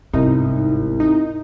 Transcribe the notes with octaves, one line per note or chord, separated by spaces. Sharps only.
G1 C2 G#2 D#4
D#4